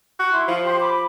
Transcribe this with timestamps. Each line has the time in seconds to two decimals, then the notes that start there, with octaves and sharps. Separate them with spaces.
0.19 F#4
0.31 E4 C6
0.48 F3 F4
0.64 G4 C6
0.80 B5 D6